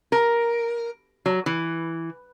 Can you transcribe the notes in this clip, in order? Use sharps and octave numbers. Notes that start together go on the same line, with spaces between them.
A#4
F#3
E3